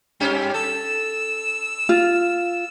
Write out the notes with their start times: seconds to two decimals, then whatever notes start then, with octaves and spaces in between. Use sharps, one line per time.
0.20 G2 C#4 G4
0.54 A4 E6
1.89 F4